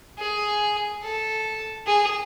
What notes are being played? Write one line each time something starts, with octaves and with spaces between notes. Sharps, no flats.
G#4
A4
G#4